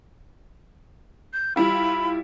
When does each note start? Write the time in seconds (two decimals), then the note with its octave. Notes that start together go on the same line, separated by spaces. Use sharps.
1.33 G6
1.56 G3 E4 F4 B5